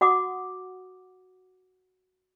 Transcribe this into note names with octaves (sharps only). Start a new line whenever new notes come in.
F#4 F#5 D6 D#6